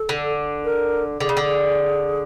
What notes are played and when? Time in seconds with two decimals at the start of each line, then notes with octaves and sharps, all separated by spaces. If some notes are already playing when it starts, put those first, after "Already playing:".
Already playing: A4
0.09 D3
0.65 A#4
1.20 D3 G#4
1.29 C#3
1.37 D3